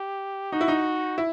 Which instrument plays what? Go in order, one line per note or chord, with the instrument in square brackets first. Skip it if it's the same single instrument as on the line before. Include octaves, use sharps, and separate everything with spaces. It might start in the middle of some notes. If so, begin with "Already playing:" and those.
Already playing: [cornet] G4
[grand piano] D#4 [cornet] F#4
[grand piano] E4
D#4
E4